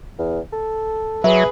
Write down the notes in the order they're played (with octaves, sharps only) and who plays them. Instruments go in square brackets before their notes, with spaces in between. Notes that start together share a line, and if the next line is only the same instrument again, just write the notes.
[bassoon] E2
A4
[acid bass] F#3 [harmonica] G#4 B4 [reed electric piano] E5